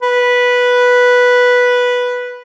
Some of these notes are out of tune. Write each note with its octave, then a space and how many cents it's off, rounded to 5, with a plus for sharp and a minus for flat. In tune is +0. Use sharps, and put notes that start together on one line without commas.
B4 -5